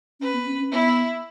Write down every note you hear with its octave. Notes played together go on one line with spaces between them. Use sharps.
C#4 B4
B3
C#4
C#4
B3 E4